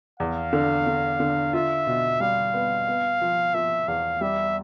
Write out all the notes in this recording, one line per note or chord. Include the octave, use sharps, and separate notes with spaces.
E2 F5
D3
D3
D3
F4 E5
B2
G3 F5
B3
B3
F3
F3 E5
E2 F5
G3 E5